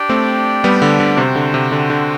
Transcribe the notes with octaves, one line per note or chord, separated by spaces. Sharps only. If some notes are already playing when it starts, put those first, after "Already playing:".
Already playing: D4 G4 D5 G5
A3 C4
G3 B3
D3
D3
C3 F#4 C5 G5
D3
C3
D3
D3